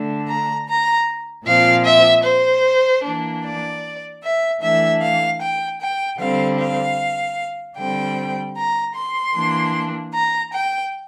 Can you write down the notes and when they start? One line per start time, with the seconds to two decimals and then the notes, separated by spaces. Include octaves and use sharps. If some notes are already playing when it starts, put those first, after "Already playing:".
Already playing: D3 A3 D4
0.28 A#5
0.67 A#5
1.46 A#2 F3 C4 F5
1.86 E5
2.24 C5
3.04 E3 A#3 D4
3.44 D5
4.22 E5
4.61 E3 A3 D4 E5
5.01 F5
5.41 G5
5.80 G5
6.19 D3 G3 C4 F5
6.58 F5
7.77 D3 G3 C4 G5
8.56 A#5
8.94 C6
9.34 E3 A#3 D4
10.13 A#5
10.53 G5